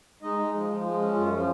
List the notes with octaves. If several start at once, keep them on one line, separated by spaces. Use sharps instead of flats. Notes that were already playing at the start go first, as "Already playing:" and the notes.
G#3 D#4 D#5
G#3
F3
F3
G#3
C#4
F#2 F4
F3